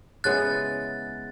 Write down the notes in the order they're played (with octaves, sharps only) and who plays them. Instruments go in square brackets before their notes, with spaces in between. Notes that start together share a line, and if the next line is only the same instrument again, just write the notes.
[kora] C#3 G#3 B3 E4 [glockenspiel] F#6 A6